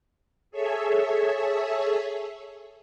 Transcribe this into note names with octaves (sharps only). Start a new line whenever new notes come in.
G#4 A4 C#5 E5